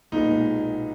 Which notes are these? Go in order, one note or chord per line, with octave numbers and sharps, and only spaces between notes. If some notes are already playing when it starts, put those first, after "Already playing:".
B1 A#2 G#3 B3 D#4